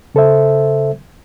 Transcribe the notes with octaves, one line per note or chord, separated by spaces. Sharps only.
C#3 A4 C5 E5